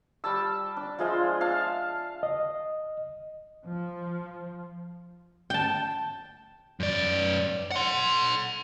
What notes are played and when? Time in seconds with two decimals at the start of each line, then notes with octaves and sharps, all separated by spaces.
0.24 G3 A5 E6
0.77 D4
0.99 F3 G#3 F4 E5
1.41 E5 F5 A5
2.23 D#5
3.64 F3
5.50 G5 A5
6.80 F#2 D5
7.71 F#5 C6